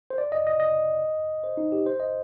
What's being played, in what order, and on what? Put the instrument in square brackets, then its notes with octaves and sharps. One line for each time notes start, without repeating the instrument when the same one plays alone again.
[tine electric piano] C5
D5
D#5
D#5
D#5
C5
D#4
G4
C5
D#5